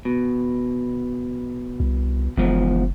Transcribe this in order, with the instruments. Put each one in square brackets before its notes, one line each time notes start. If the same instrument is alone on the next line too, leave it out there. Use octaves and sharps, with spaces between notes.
[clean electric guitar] B2
[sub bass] C2
[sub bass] F#1 [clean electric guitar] E2 G#2 F3